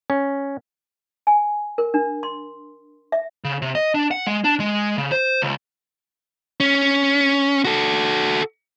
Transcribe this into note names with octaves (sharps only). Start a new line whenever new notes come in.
C#4
G#5
A#4
D4
C6
E5
C#3
C3
D#5
D4
F#5
G#3
D4
G#3
C#3
C5
C#2
C#4
F#4 A4